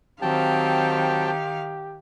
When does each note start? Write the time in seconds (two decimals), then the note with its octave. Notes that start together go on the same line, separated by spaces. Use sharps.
0.22 D#3 F#3 C4 G4 F5 G5 A5